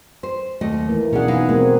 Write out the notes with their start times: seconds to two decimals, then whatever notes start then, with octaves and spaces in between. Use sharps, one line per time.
0.23 C5
0.61 D#2 A3 D#5
0.89 E3 A#3
1.13 B2 C#4 D4 G#4 F#5
1.28 E3 D#4 F5
1.49 G#3 A#3 C4